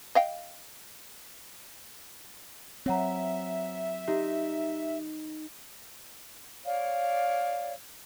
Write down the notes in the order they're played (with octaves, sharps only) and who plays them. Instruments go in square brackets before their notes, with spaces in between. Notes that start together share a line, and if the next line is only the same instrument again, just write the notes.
[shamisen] D#5 F5 G5
[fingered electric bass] F#3 C4 [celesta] C#5 F#5 A#5 [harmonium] E5
[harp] D#4 [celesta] G4
[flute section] C#5 D5 F5